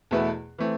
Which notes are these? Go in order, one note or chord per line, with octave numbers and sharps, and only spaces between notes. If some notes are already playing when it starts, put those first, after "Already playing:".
E2 B2 A3 E4 B4
E3 A3 C4